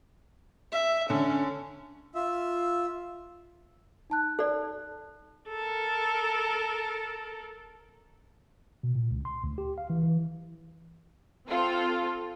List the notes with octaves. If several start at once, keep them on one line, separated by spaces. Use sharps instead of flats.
E5
D3 C#4
F4 E5
D#4 A5 F#6
A4 D5
A4 A#4
B2
A#2
C#2
C6
D2
G4
F5
E3
E3
C4 F4 A4